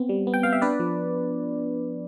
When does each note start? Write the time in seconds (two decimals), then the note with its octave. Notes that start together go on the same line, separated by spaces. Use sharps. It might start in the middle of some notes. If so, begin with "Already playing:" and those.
Already playing: B3 C4
0.09 G3
0.27 B3
0.34 G5
0.43 B3 F5
0.53 E5
0.62 D4 B4 D5
0.80 F3